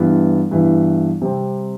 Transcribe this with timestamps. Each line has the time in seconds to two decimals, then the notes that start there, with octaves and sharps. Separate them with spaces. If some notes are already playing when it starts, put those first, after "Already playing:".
Already playing: G2 E3 B3 E4
0.51 G2 E3 B3 E4
1.22 C3 G3 C4